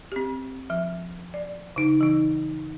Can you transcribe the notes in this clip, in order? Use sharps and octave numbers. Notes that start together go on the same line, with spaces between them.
C4 G4
F3 E5
D5
C#3 D#4
E3 D#4